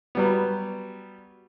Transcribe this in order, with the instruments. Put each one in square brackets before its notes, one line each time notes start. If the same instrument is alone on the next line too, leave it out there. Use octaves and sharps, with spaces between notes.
[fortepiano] F#3 G3 B3